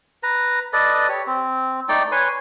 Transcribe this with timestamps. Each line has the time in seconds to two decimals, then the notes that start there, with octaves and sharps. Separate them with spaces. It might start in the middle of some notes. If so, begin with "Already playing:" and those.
0.23 B4 A#5
0.73 A4 B4 D5 D#5
1.09 G4 C#5
1.27 C4
1.89 A3 D#4 D5 G5
2.12 B4 C#5 G#5 C6